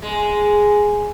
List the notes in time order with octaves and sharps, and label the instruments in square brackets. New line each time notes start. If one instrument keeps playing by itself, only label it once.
[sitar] G#3